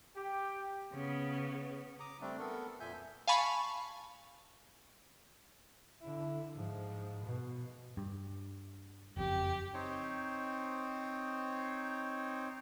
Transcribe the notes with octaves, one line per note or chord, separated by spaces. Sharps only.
G4
C#3 B3
A#5 D6 D#6
G3 A3 C4 D4
B3 A4 A#4
F2 A#2 E5 G#5 G6
F5 G#5 A5 B5 C#6
D3 E4
G#2 F3
B2
G2
F#1 F2 G4
C4 D#4 C5 C#5